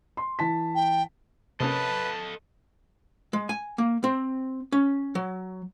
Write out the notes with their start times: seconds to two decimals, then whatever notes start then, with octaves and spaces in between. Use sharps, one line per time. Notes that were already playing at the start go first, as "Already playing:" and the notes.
0.17 C6
0.39 E3 A5 B6
0.75 G5
1.60 C3 A#3 C#4 A4 B4 D#5 A5
3.33 G#3
3.49 G#5
3.78 A#3
4.04 C4
4.72 C#4
5.15 F#3